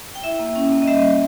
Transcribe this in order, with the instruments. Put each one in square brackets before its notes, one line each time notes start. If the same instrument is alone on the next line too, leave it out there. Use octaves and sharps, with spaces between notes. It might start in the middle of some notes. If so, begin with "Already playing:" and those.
[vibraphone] G5
E4 E5
A#3
C#4
A#3
D#5
G3 E5
G3